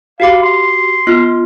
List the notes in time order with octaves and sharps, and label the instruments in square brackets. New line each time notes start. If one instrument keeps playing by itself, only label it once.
[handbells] F#4 G4 D6 [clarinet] F5
[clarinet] C6
[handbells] B3 F4 F6